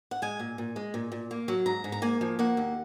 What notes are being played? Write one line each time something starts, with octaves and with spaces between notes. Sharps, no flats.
F#5
G#3 G#5
A#2
A#2
G#3
A#2
A#2
A#3
F#3
G#2 A#5
G#2
A#5
A#3 G#5
F3
A#3 F#5
D#2